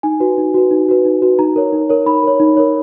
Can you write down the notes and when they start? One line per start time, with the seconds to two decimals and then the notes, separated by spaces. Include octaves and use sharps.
0.03 D#4 G#5
0.20 F#4 B4
0.38 D#4
0.54 F#4 B4
0.71 D#4
0.89 F#4 B4
1.05 D#4
1.22 F#4 B4
1.39 D#4 A#5
1.56 A#4 C#5
1.73 D#4
1.89 A#4 C#5
2.06 D#4 B5
2.23 A#4 C#5
2.40 D#4
2.57 A#4 C#5